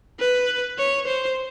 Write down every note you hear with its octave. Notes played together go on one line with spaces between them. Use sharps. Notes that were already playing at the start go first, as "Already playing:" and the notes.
B4
C#5
C5